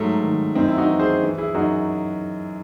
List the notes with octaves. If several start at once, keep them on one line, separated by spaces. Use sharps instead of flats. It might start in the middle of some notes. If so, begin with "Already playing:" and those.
Already playing: G#2 F#3 A3
D#3
F#2 C4 D#4
E4
D#4 F#4
E3
G#4 C5
E3
E4 G#4
F#2 D#4 F#4